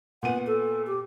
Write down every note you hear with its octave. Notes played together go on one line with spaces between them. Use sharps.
A#2 B3 F#5 D#7
A4
G4